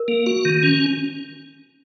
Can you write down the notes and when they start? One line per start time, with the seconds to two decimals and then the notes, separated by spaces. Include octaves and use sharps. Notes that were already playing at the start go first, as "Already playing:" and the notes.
Already playing: A#4
0.08 A#3
0.26 F#4
0.45 D#3
0.63 C#4